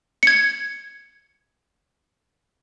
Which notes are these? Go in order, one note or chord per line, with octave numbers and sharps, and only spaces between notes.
G#6 C#7